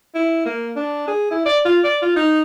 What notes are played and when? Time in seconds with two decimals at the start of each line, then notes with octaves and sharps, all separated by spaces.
0.15 E4
0.45 A#3
0.76 D4
1.08 G#4
1.31 E4
1.46 D5
1.65 F4
1.84 D5
2.02 F4
2.16 D#4